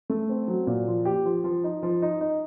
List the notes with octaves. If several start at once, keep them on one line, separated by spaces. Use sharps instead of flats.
A3
C4
F#3
A#2
F3
G4
F3
F3
D#4
F3
D#4
D#4